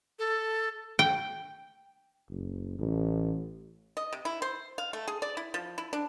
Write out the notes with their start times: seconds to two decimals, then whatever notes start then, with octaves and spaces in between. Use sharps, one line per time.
0.19 A4
0.99 G5
2.29 F#1
2.79 A1
3.97 D#5
4.13 C3
4.25 E4
4.42 C5
4.78 F5
4.93 A3
5.08 G#4
5.22 D5
5.37 E4
5.54 F3
5.78 E4
5.93 D4